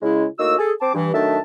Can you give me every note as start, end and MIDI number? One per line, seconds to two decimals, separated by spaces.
0.02 0.26 49
0.02 0.26 56
0.02 0.26 64
0.39 0.55 45
0.39 0.55 58
0.39 0.55 63
0.39 0.55 66
0.39 0.55 88
0.59 0.72 68
0.59 0.72 69
0.81 0.92 60
0.81 0.92 72
0.81 0.92 81
0.81 0.92 86
0.94 1.12 43
0.94 1.12 52
1.14 1.38 51
1.14 1.38 54
1.14 1.38 57
1.14 1.38 62
1.14 1.38 76
1.14 1.38 81